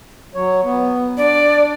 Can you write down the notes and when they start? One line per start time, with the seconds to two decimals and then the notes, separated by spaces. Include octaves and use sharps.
0.35 F#3 C#5
0.64 B3
1.17 D4 D5